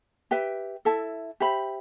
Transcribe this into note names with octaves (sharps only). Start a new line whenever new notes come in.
G4 B4 E5 G5
E4 A4 E5 A5
G4 C5 E5 B5